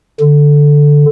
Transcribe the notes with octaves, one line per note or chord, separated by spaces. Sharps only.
D3